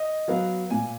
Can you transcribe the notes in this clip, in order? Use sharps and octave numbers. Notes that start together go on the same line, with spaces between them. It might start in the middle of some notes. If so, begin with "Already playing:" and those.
Already playing: D#5
F#3 B3 F5
A#2 G#5